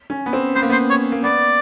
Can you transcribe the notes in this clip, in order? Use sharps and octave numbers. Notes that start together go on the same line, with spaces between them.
C#4
B3
C4
B3 C5
A#3
B3 C5
C#5
A#3
B3 D5